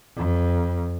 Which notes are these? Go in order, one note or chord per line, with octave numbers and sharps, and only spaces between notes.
F2